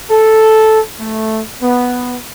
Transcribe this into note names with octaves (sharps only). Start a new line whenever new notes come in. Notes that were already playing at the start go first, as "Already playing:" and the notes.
A4
A3
B3